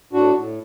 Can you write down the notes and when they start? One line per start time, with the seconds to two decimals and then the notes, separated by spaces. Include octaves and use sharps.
0.13 A2 D4 F#4
0.35 A2